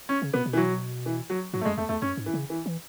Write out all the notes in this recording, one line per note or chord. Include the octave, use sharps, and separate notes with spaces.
C#4
C#3
B2 B3
B2
E3
F#3
E3
F#3
G#2 F#3
A3
F#2 G#3
E2 A3
E2 A3
F#2 C#4
G#2
E3
C#3
E3
E3